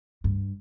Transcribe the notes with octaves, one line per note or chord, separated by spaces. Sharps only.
G2